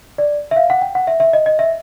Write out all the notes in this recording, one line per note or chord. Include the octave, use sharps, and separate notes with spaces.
D5
E5
F5
F#5
G5
F#5
E5
E5
D#5
D#5
E5